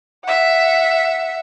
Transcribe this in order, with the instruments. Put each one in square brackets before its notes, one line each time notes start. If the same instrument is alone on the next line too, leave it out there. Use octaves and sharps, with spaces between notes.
[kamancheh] E5 F#5